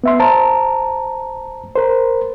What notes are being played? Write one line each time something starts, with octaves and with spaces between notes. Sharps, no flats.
B3 E5 C6
C5 A5 A#5
A#4 C5